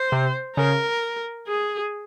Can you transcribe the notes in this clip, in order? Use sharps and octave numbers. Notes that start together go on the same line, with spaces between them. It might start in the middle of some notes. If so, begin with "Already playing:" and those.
Already playing: C5
C3
C#3 A#4
G#4